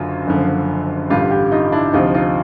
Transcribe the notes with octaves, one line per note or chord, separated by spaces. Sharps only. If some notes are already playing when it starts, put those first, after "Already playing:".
Already playing: F#1 F#2 D3 F#3 F4
F#1 F#2 D3 F3
A1 G2 D3 G3 F4 G4
F4 G4
D#4 F4
D4 E4
D2 C3 F3 D#4 F4
D#4 F4